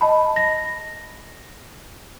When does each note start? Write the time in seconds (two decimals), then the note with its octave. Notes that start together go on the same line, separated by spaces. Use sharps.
0.01 D#5 A5 B5
0.36 A#6